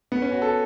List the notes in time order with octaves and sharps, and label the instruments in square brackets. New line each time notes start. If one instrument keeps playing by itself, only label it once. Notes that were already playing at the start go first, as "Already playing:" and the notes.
[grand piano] B3
C#4
F#4
A4